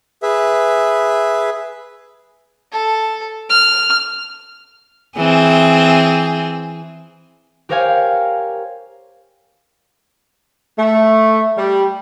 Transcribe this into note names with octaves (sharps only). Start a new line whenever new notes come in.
G#4 B4 E5
A4
F6
E3 C4 G#4
G4 A#4 C5 C#5 F5 G#5
A3
G3